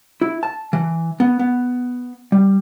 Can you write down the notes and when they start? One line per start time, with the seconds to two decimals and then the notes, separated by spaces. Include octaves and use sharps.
0.22 E4
0.43 A5
0.73 E3
1.20 B3
1.39 B3
2.32 G3